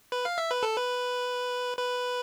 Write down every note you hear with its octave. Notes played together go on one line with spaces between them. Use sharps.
B4
F5
E5
B4
A4
B4
B4